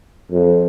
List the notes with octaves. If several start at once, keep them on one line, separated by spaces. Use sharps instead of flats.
F2